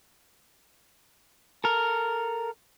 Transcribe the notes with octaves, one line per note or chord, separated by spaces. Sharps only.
A4 A#4